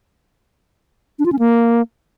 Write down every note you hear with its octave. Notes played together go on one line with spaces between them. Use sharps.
D4
F4
C#4
A#3